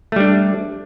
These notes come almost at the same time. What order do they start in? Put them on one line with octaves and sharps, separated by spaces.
A3 G3 D4